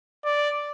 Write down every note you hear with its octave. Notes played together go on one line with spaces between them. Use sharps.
D5